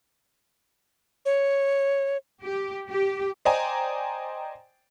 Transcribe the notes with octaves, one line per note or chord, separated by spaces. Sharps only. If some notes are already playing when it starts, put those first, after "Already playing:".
C#5
G4
G4
C5 D5 D#5 G5 G#5 A#5